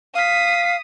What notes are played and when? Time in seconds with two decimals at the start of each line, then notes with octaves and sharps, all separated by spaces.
0.15 F5 D#6 B6